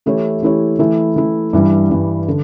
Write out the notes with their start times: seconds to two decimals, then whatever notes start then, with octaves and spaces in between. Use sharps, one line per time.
0.06 E3 A3 E4 G4 C#5
0.43 E3 A3 E4 G4 C#5
0.79 E3 A3 E4
1.16 E3 A3 E4
1.53 G2 E3 G3
1.90 G2 E3 G3
2.28 D3